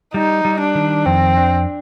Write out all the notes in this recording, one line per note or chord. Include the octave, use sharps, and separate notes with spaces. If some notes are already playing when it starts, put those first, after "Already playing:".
G3 D#4
G3
D4
D#3
F2 C4
D4